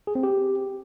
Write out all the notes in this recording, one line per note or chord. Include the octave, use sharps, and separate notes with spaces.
G#4
C4
G4